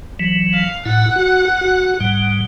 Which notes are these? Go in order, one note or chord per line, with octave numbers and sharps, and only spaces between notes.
E3 F#3
F5
A2 E4 F#5
F#4
F#4
G#2 G3